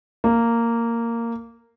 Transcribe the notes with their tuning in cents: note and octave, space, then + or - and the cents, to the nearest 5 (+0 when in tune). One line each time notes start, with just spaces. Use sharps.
A#3 -10